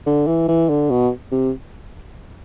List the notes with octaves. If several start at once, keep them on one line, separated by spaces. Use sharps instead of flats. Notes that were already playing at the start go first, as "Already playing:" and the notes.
D3
E3
E3
D3
B2
C3